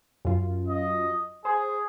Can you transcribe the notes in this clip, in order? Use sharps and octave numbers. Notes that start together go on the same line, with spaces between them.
F#2 F4
D#5
G#4 C5